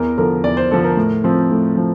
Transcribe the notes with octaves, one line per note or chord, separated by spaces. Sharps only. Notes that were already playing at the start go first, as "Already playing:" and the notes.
Already playing: E2 A#4
D3 F3 A#4
E2 D5
C5
D3 F3 A4
A#4
A2
F3 C4
A2
F3